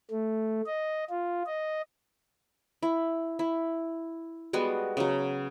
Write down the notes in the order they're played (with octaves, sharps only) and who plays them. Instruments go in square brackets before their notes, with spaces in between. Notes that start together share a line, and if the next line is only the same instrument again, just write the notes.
[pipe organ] A3
D#5
F4
D#5
[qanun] E4
E4
G3 G#3 B3 F#4
C#3 F#3